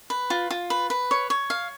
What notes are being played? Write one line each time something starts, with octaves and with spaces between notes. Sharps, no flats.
B4
F4
F4
B4
B4
C#5
C#5
F5